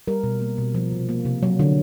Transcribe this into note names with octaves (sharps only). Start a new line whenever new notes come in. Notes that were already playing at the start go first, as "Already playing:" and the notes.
G3 A#4
B2
A#3
B2
F3
C3
A#3
C3
F#3
D3